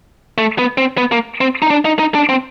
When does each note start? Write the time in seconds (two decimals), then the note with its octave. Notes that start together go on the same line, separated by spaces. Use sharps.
0.38 A3
0.58 B3
0.78 C4
0.98 B3
1.12 A#3
1.41 C4
1.62 D#4
1.70 D4
1.85 D#4
1.99 D#4
2.15 D4
2.29 C4